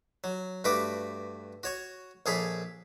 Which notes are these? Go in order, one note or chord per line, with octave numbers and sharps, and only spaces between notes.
F#3
G2 A3 F#4 B4 D6
F#4 C#5 C#6
A#1 G#4 A4 C#5 B5